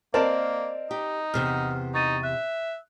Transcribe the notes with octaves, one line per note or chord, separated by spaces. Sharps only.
A#3 C4 A#4 D5 D#5 A5
D#4 G4
E2 C3 B3 F6
D#4 C#6 A6 D#7
E5 F#6